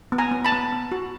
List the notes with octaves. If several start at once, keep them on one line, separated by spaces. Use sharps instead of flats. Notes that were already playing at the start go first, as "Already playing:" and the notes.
B3
G#5 A#5
B3
A5 B5
B3
B3
F#4